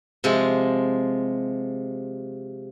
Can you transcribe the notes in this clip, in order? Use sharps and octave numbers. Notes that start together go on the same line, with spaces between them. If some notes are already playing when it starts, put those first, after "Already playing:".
C3 F3 G#3